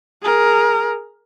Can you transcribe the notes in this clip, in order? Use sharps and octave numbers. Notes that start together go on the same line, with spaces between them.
G#4 A#4